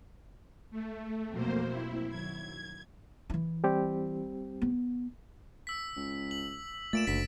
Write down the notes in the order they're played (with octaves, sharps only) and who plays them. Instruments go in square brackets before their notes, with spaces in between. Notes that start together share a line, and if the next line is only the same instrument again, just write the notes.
[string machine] A3
[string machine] F2 A#3 C5 [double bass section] B2 F#3 C4
[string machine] E4
[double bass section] F#2 D#3 F#3 [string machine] G#6
[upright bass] E3 E4
[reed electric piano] G3 C4 G4
[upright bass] B3
[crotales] E6 B6
[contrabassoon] C#2
[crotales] F#7
[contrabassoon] A#2 [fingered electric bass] A3 [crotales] A6 D7 E7
[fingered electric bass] F#1 [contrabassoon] D2 [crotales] B6